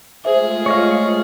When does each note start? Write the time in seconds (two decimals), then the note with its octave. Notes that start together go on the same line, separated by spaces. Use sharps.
0.25 G#3 A3 F4 G#4 C5 E5
0.66 C#5 D#5 F5